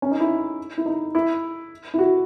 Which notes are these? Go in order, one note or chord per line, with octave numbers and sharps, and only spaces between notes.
C#4
D#4
E4
E4
D#4
E4
E4
F#4